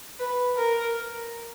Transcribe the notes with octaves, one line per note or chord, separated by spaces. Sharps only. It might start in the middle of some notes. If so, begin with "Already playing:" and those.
B4
A#4